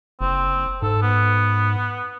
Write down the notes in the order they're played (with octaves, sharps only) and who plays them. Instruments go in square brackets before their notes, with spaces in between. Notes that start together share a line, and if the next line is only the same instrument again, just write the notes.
[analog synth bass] F#1 [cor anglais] C4
[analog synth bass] G#2 [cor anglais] A4
[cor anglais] B3